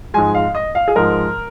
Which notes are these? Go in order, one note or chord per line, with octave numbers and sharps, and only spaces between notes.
G#2 F3 G#3 G#5
F5
D#5
F5
G#4
G#2 F3 G#3 A#4